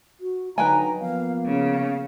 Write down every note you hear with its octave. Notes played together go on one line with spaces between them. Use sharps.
F#4
D3 F#3 D#4 B4 G5 G#5 A#5
F3 A#3 B3 F5
C#3 F5